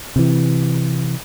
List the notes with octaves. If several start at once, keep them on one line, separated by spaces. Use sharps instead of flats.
C3 E3